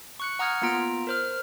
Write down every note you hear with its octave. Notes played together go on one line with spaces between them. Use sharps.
C#6 F#6 C#7
F#5 A#5 D#6 F6 G#6 C#7
A#3 B3 F4 A#5 D7
A#4 C5 F6